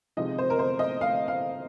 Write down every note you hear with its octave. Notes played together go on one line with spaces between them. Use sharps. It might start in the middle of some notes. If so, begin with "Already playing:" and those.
C3 F3 G#3 D#4 D#5
C5
A#4
C5
D#5
F5
F5